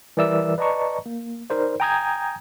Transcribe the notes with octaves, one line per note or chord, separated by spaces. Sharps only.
E3 G3 A#4 D5 E5 E6
B4 D5 D#5 A5 A#5 C#6
A#3
D#4 A#4 C5 D5
G5 G#5 A#5 D#6 G6 G#6